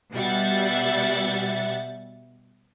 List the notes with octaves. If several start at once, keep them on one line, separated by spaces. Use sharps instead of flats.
B2 G3 E5 F#5 A6